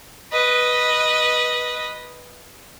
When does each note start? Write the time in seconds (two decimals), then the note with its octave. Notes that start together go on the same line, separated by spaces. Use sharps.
0.33 B4 D#5